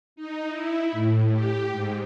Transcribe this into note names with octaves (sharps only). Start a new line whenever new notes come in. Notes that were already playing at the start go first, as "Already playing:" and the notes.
D#4
E4
A2
G4
G#2